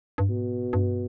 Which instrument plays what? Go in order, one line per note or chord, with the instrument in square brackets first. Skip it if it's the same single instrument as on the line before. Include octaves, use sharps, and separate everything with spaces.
[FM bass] G2
[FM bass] G#2 [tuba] B2
[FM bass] G2